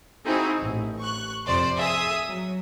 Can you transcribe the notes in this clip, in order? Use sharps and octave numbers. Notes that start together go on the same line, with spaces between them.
C4 D#4 E4 F#4 G#4
A1
C#6 F#6
F2 C3 C5 D5 C6
G#4 E5 D#6
F#3